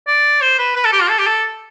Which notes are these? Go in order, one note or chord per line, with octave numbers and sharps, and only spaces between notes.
D5
C5
B4
B4
A4
G4
F4
A4
G4
A4